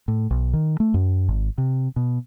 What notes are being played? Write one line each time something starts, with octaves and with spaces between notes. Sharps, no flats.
A2
B1
D#3
A3
F#2
G#1
C3
B2